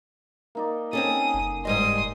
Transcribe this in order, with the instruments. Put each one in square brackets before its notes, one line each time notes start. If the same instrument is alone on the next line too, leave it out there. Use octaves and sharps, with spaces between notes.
[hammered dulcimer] A#3 D#4 D5
[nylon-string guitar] C4 C#4 A4 [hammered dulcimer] G#4 [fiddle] D#6
[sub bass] F#1
[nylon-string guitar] G#2 G3 D#5 [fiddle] C6 D#6